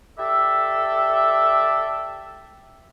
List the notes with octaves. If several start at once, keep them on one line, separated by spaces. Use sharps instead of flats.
G4 A4 D5 E5